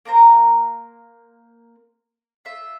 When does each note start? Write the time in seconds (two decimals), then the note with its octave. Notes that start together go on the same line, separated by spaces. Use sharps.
0.05 A#3 A#4 C5 A#5
2.45 F4 E5